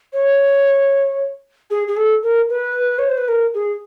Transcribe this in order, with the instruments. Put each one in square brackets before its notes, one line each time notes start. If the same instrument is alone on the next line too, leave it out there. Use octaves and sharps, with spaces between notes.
[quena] C#5
G#4
G#4
A4
A#4
B4
C#5
C5
B4
A#4
G#4